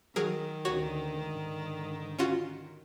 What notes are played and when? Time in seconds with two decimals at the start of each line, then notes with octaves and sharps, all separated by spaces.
0.16 D#3 F#3 G#4 A#4
0.65 D2 D3 F#4 C#5 C#6
1.27 G#2 D3
2.19 C#4 F4 F#4